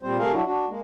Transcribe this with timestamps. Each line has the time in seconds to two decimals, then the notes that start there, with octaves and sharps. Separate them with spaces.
0.03 A#2 G3 C4 C5
0.18 C3 A3 G#4 A#4 F5
0.32 F#3 D4 E4 F#4
0.46 D4 F#4
0.69 G#3 A#3